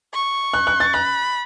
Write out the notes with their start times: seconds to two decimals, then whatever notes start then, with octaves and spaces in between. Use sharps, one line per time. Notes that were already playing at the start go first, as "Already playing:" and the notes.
0.14 C#6
0.54 F#6
0.67 F#6
0.80 A6
0.93 B5 F#6